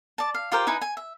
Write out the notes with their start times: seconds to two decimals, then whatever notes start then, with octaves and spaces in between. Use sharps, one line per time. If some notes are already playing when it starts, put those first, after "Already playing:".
0.18 D5 A5
0.34 F5
0.52 F4 G4 A#4 C5
0.67 D#4 E4 B4 G#5
0.81 G#5
0.97 E5